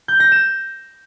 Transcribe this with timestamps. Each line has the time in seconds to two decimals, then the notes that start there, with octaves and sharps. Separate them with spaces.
0.08 G6
0.20 A#6
0.32 E7